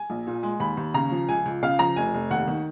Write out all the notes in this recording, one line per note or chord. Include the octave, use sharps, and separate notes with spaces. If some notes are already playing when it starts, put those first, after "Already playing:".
Already playing: G#5
A#1
A#2
G#3
D#2 B5
D#2
C#3 A#5
F3
C#2 G#5
C#2
C#3 F5
F3 A#5
F1 G#5
F1
D#2 F#5
D#3